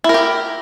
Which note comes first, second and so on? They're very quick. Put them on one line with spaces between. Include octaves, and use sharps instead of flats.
E4 A#4 G4